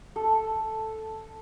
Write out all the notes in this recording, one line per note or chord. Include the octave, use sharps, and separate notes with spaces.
A4